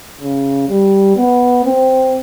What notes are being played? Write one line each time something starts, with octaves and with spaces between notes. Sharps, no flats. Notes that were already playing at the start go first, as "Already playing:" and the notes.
C#3
G3
B3
C4